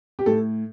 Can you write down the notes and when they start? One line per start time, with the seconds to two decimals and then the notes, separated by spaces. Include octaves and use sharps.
0.19 G4
0.26 A2 A4